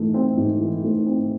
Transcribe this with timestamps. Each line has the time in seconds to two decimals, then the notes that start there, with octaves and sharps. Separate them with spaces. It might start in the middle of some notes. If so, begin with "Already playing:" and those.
Already playing: G#2 E3 A3
0.14 C4
0.37 G#2
0.60 E3
0.84 A3
1.06 C4